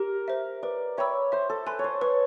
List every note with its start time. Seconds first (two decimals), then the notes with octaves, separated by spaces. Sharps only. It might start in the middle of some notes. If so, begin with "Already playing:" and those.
Already playing: G4 A#4
0.28 C5 E5
0.63 B4 D5
0.97 C#5 E5 G5 B5 E6
1.32 C5 E5
1.50 A4
1.66 B4 G#5 C6
1.79 C#5
1.84 C5
2.01 B4 C#5